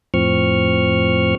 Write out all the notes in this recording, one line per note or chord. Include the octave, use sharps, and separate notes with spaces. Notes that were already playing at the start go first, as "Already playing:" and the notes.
F2 A2 F3 C4 C#6 F6